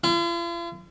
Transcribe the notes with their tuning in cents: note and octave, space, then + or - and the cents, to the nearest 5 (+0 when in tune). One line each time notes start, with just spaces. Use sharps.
F4 -45